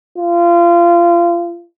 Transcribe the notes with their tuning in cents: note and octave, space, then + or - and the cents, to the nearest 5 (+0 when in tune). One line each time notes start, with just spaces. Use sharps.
F4 -25